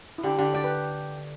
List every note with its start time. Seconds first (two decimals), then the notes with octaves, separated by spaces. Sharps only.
0.18 E4
0.23 D3 G4
0.39 D3 G4
0.54 G4 D5
0.64 B4